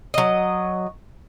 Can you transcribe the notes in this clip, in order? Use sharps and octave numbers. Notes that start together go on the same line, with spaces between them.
F#3 D#5